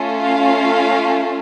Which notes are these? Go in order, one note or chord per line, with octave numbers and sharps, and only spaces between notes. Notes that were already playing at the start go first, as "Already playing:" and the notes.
Already playing: A3 C#4 F4
F5